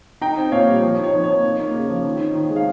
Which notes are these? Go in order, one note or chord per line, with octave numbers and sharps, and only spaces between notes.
D#4 G5 A#5
C4
A#2 C#5 F5
G3
F3 C#5
D#4
C#5
F3
A#3 C#5
D#4
A#3
C#3
F3
D#3
D#4
D#3
G#3
F5